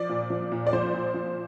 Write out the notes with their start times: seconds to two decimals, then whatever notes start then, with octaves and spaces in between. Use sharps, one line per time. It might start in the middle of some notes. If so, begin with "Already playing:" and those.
Already playing: F3 D5
0.09 A#2
0.30 F3
0.52 A#2
0.67 D5
0.73 F3 C5
0.94 A#2
1.14 F3